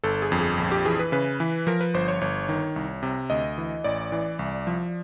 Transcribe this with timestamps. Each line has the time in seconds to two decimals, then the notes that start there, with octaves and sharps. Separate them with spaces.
0.04 G1 A4
0.22 G#4
0.32 F2
0.41 G#4
0.58 A#1
0.72 G4
0.85 E3 G#4
0.99 B4
1.12 C#3 B4
1.40 E3
1.67 F3 A#4
1.81 B4
1.94 G1 C5
2.08 C#5
2.21 G1 C#5
2.49 D#3
2.76 C2
3.03 C3
3.30 D2 D#5
3.58 E3
3.84 A1 D5
4.12 E3
4.39 C2
4.67 F3